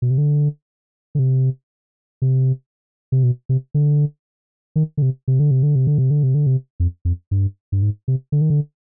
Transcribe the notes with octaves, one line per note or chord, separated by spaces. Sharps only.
B2
C3
D3
D3
C3
C3
C3
B2
C3
D3
D#3
D3
C3
C3
D3
C3
D3
C3
D3
C3
D3
C3
D3
C3
F2
F2
G2
G2
G#2
C3
D3
D#3
D3